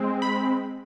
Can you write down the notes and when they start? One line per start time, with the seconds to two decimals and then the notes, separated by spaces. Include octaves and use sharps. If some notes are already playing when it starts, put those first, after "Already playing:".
Already playing: G#3 C4
0.22 B5